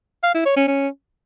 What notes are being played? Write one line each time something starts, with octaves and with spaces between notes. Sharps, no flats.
F5
E4
C#5
C#4
C#4